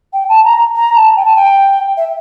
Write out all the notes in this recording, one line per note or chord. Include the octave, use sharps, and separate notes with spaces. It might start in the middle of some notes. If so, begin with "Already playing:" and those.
G5
A5
A#5
A#5
A5
G5
A5
G5
E5